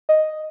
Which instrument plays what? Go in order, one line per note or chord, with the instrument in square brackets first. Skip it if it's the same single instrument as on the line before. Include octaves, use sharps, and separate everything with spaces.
[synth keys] D#5